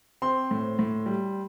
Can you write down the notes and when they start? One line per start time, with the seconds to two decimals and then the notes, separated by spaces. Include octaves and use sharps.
0.22 C4 C6
0.51 A2
0.79 A2
1.06 G3